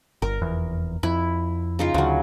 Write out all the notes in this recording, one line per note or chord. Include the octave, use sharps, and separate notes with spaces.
G1 A#4
F1 E2
F2 E4
C#3 D#4 F4
D2 C#3 F#3